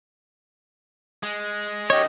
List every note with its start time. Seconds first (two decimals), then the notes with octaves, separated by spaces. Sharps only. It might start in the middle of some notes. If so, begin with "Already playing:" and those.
1.23 G#3
1.90 F#2 D#3 G4 C#5 D#5